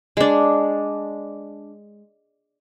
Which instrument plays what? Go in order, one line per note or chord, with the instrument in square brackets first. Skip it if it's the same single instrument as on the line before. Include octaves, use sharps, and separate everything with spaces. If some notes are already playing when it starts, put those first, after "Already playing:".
[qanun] G#3 D4